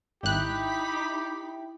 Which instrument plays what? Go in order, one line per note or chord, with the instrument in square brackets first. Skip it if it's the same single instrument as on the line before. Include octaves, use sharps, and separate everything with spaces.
[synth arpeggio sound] G#1 F#6 [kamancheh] D#4 B5 [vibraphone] E4 E5 G5 [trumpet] G4